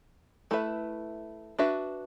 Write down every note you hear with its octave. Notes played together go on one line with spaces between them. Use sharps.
A3 E4 B4 E5
D4 F#4 B4 E5